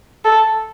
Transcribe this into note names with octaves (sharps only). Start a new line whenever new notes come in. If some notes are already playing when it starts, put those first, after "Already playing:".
A4